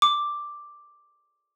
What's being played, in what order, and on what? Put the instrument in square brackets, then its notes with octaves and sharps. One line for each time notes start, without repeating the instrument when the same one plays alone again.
[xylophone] D6